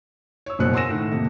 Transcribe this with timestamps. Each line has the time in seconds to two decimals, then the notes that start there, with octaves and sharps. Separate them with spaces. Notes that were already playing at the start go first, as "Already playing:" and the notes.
0.46 C#5 E6
0.59 F#1 F#2 B2 C5 F#6 C#7
0.73 F#5 G#5 C6 E6 A#6 E7
0.89 A2 D#3
1.11 F2 C3 A#3